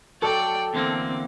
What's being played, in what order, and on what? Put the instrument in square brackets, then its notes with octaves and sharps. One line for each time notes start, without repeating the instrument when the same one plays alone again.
[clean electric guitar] F#3 [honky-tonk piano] A4 [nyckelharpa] D5 G5
[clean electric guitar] E2 D3 A#3 [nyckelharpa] C4